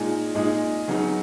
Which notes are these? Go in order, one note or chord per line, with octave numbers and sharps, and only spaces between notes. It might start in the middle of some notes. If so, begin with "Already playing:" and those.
Already playing: A#2 G#3 D#4 G#4
A#2 G#3 D#4 G#4
C#3 F#3 B3 D#4